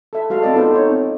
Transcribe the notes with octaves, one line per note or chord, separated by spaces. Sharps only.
A4 E5
G#3 F#4 A4 F5
C4 A4 D5 D#5
B3 D#4 F4 A4 C5
D#4 C#5
C4